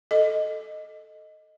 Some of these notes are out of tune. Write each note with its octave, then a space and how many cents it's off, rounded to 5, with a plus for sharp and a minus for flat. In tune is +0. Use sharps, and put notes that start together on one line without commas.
A4 +0 D#5 +0